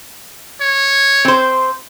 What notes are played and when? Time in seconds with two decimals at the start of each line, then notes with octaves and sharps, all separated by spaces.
0.61 C#5
1.25 C4 C5